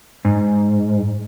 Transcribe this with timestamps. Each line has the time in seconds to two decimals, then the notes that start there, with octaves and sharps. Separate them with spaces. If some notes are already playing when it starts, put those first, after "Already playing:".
0.25 G#2